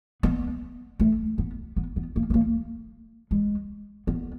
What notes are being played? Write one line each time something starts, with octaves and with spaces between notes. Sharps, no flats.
B3
A3
B3
B3
B3
A#3
B3
A#3
G#3
B3